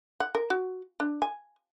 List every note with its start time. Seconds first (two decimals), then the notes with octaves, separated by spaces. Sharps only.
0.20 F#5
0.35 A#4
0.50 F#4
1.00 D4
1.22 G#5